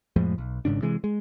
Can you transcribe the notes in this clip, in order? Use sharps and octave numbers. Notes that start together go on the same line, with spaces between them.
F2 A2 F3 G#3
B1
G#1 G#2 C#3 D4
C3 E3 G#3
G#3